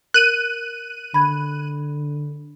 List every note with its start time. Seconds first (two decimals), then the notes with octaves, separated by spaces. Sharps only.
0.14 A#4 F#6 D#7
1.14 D3 B5 G#6